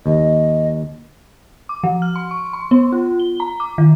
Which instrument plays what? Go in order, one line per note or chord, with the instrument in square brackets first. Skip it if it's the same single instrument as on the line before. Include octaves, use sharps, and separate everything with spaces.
[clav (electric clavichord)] D#2 [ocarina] D#5
[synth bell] D6
F3
F6
C6
C#6
C6
B3
F4
G7
A#5
D6
D#3